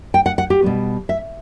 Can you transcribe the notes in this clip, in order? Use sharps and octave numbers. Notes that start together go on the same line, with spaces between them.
G5
F#5
F#5
G4
B2 G3 B3
E5